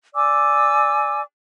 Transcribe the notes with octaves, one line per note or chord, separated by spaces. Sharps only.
D5 G#5 D6 E6